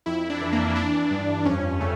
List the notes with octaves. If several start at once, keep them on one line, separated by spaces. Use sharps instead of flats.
F2 E4
D4
E3
A#3
E3 D4
G2
F2 C#4
C#3 A3